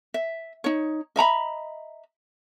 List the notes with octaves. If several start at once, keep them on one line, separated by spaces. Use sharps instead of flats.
E5
D#4 C#5
D#5 E5 A#5 B5